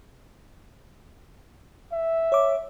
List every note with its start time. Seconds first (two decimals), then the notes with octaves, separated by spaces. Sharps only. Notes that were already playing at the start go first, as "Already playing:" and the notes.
1.92 E5
2.32 C#5 D6